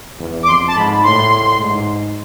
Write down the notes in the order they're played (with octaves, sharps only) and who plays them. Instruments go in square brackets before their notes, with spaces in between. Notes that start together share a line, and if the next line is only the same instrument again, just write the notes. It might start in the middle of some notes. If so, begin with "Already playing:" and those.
[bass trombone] E2
[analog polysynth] D6
[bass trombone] F2 [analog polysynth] C6
[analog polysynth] A5
[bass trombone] G#2 [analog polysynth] B5
[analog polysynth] B5
[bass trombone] A2 [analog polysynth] C6
[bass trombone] G#2